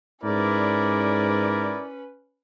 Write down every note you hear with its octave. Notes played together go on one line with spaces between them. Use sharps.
G#2 C#4 E4 A#4 B4 D5